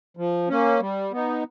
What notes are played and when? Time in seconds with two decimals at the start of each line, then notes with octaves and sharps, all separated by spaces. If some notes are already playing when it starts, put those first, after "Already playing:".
0.17 F3
0.49 A#3 C#4
0.80 G3
1.12 B3 D#4